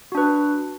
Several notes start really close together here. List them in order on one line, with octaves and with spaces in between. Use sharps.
F#4 D4 B4